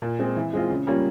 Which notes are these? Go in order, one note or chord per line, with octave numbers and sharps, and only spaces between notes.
A#2
G#3 C4
E3
G#3 C4 F4
C#3
G3 A#3 C#4 F4